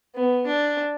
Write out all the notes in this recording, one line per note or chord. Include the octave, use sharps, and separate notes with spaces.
B3
D4